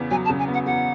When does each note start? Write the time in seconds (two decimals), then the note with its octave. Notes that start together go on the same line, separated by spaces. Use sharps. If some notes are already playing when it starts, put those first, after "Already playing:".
Already playing: E2 C#3 B3
0.11 F#3 G#5
0.25 A5
0.30 C#3
0.39 G#5
0.48 B3
0.53 F#5
0.66 E2 F#5